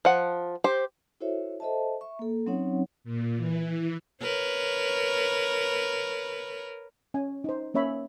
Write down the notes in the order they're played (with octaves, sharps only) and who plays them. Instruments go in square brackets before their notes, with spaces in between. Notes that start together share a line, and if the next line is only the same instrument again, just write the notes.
[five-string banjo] F3 F#5
G4 C5
[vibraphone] E4 F#4 A4 C5 C#5 E5
A4 C5 D#5 E5 A5
E5 C#6
A#3 A4
F#3 C4 C#4 D#4 C#5 F#5
[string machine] A#2
E3
[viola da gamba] A#4 B4 C#5
[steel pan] C#4 G#5
D#4 C5
A#3 C#4 C#5 E5 B5